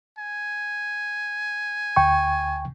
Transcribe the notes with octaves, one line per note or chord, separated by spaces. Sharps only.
G#5
D2 G5 C#6